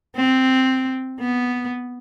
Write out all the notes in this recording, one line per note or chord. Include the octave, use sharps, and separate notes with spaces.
C4
B3